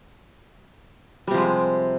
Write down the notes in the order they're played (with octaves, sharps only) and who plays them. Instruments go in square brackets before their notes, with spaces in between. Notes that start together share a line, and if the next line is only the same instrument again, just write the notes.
[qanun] G3
C3
F3
G#3